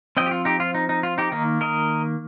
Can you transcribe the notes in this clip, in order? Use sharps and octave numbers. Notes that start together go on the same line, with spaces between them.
F3 C4 D#5 G5
G4
F4
D#4 G4
F4
D#4
D#4
F4
D#4 G4
D#3 A#3 D#4
A#4 D#5